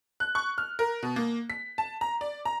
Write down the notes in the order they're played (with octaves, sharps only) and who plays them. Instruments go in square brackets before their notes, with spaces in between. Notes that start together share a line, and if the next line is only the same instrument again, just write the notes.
[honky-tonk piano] F#6
C#6
F6
A#4
B2
A#3
B6
A5
A#5
D5
A#5